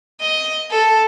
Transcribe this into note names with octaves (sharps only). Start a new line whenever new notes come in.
D#5
A4